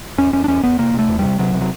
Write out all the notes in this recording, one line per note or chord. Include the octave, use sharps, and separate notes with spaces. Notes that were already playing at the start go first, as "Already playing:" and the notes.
E2 C#4
E2 C#4
D4
E2 C#4
E2 B3
C3 A#3
C3 A3
E2
C3 G3
C3 F#3
C3
F#3